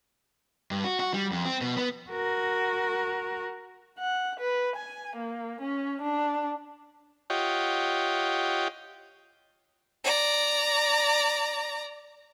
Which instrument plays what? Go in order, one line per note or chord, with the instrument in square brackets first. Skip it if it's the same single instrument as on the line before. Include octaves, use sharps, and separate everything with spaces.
[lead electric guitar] G2
F#4
F#4
G3
F2
C4
B2
B3
[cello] F#4 A#4
[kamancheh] F#5
B4
G#5
A#3
C#4
D4
[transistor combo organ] F4 G4 C#5 D#5 F#5 G5
[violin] D5 A#5